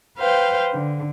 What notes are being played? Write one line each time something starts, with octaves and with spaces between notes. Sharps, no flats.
B4 C5 F5 G5
D3